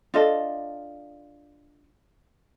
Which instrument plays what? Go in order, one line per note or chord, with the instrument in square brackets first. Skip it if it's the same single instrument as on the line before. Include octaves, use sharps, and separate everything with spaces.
[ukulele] D4 F4 A4 D#5